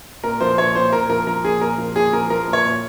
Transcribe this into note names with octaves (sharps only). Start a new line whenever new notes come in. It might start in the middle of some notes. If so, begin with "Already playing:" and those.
A#2 A#4
F3 C5
A#2 C#5
A#2 C5
A#2 A#4
F3 A#4
F3 A#4
A#2 G#4
A#2 A#4
F3
A#2 G#4
F3 A#4
F3 A#4
A#2
C#5
A#2